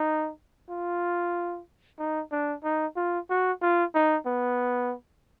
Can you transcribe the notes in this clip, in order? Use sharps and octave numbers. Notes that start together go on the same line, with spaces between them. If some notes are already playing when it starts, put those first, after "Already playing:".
Already playing: D#4
F4
D#4
D4
D#4
F4
F#4
F4
D#4
B3